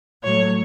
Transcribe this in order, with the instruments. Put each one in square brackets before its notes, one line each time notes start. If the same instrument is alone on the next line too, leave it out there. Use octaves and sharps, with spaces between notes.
[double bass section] A2 F#3 A3 [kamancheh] C#5